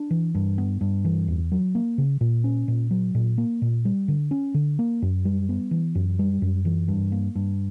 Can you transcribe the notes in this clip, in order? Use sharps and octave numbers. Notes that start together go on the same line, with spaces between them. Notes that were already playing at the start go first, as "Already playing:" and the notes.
Already playing: D4
E3
G2
B3
G2
E3
E2
F#3
A#3
C#3
A#2
C#4
A#2
F#3
A#2
A#3
A#2
G3
D3
C#4
D3
A#3
F#2
G3
B3
E3
F#2
G3
F#2
E3
G2
A#3
G2